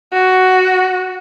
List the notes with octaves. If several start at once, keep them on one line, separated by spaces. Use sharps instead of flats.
F#4